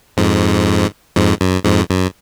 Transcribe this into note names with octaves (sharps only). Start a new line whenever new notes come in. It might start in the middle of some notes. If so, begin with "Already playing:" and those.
F2 G#2
F2 G#2
F#2
F2 G#2
F#2